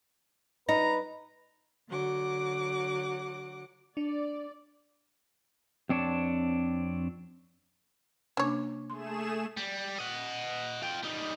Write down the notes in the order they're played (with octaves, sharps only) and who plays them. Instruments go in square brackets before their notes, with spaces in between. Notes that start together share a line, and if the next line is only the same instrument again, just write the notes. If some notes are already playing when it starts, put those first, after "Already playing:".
[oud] D#4 [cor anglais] B4 [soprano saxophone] A#5
[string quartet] D3 F#3 F#5 D6
[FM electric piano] D4 [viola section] D5
[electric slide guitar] F2 C4 D4 C#5 A5
[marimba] C3 A#3 D4 [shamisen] C#4 C#5
[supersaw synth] A3 G#4 E7 [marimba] C6
[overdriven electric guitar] G3
D#5 F#5
F4 G5
G3 D#4